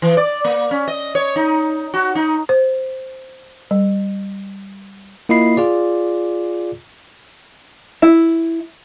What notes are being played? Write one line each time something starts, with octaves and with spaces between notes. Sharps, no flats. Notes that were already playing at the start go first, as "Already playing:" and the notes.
E3
D5
A#3
C#4
D#5
C#5
D#4
F#4
D#4
C5
G3
A#3 E4 F4 D#5 B5 C7
F4 G#4 D5
E4